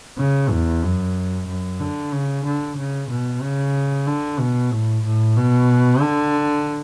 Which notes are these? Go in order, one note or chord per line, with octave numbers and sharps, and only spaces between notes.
C#3
E2
F#2
F#2
D3
C#3
D3
C#3
B2
C#3
D3
B2
A2
A2
B2
D3